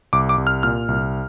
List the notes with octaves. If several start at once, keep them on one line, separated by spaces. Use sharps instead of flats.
C2 D6
D6
C2
F6
A#2 F6
C2